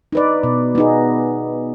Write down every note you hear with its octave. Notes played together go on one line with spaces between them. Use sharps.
D#4 B4 D5
B2
B3 D#4 G#4